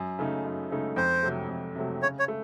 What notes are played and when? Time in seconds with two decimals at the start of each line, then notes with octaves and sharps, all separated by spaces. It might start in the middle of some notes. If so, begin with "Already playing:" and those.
Already playing: F#2
0.19 C#3 A3 D#4
0.45 F#2
0.71 C#3 A3 D#4
0.96 F2 C5
1.23 C3 F#3 A3
1.49 F2
1.76 C3 F#3 A3
2.01 C#3 C#5
2.19 C#5
2.28 A3